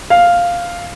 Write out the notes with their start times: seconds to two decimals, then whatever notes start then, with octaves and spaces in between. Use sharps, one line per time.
0.10 F5